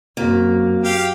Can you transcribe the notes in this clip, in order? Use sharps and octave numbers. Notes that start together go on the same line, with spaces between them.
F#2 A#3 C4 F#4 A#6
G4 F5 G5